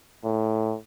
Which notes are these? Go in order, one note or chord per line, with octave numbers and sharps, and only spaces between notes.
A2